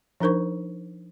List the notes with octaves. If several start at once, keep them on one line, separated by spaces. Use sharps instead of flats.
F3 D4 D#4 A#4 C5 C#6